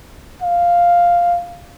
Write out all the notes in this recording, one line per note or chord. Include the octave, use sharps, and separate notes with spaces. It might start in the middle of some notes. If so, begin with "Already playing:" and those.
F5